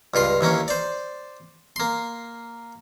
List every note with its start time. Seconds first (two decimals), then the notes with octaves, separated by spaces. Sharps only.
0.14 C#2 G2 F4 C6
0.41 D#2 E3 A#3 C#4
0.68 C5 D5
1.76 A#3 C6